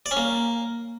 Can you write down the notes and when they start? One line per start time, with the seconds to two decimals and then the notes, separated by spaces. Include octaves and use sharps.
0.06 D5
0.11 C#4
0.17 A#3